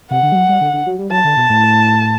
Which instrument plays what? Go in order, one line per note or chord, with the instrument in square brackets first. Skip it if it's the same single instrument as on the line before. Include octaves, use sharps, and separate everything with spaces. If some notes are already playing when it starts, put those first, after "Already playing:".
[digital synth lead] C3 [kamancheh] F#5
[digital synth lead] D3
G3
F#3
G3
D3
D3
F#3
G3
[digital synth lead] F#3 [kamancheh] A5
[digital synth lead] D3
B2
A2